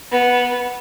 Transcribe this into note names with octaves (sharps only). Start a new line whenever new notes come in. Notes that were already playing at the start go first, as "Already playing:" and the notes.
B3